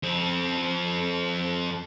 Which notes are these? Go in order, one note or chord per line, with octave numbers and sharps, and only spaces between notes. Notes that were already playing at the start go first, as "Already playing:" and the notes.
F2 C4